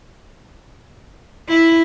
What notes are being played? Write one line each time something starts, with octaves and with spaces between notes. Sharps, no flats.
E4